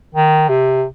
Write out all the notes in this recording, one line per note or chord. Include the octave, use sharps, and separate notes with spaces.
D#3
C3